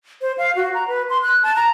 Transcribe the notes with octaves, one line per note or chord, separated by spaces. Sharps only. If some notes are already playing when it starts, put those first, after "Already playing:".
C5
F5
F#4
A#5
B4
C6
F#6
A5
A#5